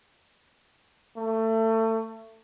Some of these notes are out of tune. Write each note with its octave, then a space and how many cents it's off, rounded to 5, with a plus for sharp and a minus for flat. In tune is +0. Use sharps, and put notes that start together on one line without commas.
A3 +25